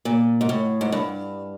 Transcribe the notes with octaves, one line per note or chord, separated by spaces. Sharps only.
A#2
G#2
A2
G#2
G2